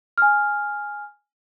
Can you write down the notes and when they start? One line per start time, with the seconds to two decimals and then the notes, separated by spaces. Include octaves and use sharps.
0.18 G#5 F6